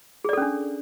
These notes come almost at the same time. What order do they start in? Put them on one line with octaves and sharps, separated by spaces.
G#4 D5 A4 C#4 D4